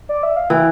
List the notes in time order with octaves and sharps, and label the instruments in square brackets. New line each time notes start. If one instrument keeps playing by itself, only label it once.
[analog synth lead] D5
E5
F5
[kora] E3 [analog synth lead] G5